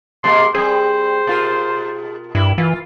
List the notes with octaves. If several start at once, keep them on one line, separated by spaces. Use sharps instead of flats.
B2 G#3 A#3 C6
G3 C4 G#4 C5
B2 F4 A#4
G2 E4
E3 F4